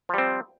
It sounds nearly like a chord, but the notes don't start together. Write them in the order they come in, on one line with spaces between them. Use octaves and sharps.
F3 G3 C4